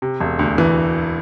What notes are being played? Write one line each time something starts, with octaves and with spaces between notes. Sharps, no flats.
C3
E1
D2
E3